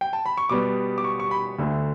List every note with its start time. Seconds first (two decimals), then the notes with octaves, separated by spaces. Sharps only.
0.01 G5
0.13 A5
0.25 B5
0.37 C#6
0.49 B2 G3 B3 D6
0.98 D6
1.04 C#6
1.20 C#6
1.31 B5
1.59 D2 D3 A3